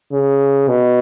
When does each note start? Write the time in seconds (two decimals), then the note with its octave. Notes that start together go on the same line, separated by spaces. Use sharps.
0.12 C#3
0.68 B2